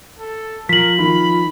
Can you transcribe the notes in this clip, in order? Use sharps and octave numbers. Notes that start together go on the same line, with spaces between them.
A4
F3 A#4 B6 F#7
D#3 B5